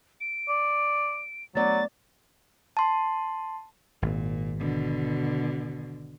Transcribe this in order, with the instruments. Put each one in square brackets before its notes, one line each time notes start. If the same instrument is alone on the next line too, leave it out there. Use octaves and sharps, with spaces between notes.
[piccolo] D7
[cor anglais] D5
[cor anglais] F#3 [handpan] A3 B3 D5 [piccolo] A6
[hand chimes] A5 C6
[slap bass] G#1 [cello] A#2
[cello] B2 D3